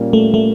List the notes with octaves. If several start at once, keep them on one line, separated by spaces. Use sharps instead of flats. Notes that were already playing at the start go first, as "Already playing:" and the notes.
Already playing: A#2 G3 A#3 C#4
A3
A3